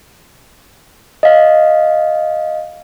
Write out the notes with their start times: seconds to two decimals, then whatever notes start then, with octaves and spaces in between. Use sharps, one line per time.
1.23 D#5 F5